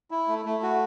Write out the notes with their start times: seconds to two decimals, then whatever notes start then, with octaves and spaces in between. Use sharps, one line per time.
0.11 E4
0.28 A3
0.45 A3
0.63 F#4